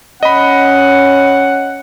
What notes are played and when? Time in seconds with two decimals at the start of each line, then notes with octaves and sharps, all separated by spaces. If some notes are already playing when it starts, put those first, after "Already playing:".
0.23 C#4 D#5 F#5 B5